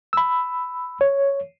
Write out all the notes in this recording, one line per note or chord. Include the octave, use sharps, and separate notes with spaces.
B5 E6
C#5